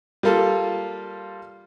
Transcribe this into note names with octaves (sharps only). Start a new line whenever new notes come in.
G3 A#3 F4 A4